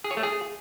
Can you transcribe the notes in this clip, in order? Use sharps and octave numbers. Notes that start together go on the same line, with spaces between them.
G#4
C#5
A3
G#4